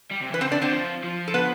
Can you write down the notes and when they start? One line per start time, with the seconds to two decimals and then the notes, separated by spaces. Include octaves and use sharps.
0.11 G3
0.21 C3
0.31 E3 B4
0.41 D3 C4 C5
0.52 C3 D4 D5
0.62 D3 C4 C5
0.72 F3
1.03 F3
1.28 A4
1.34 B3 B4